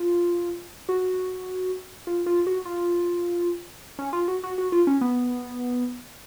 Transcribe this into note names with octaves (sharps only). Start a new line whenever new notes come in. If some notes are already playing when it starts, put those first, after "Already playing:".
Already playing: F4
F#4
F4
F4
F#4
F4
C#4
F4
F#4
F#4
F#4
F4
C#4
B3